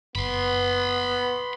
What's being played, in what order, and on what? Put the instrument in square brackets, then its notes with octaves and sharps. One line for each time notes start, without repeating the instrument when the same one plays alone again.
[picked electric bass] F#1 [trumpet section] B3 [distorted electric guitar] B5 C6